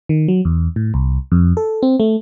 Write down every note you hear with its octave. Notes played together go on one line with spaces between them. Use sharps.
D#3
F#3
E2
A2
C2
F2
A4
C4
A3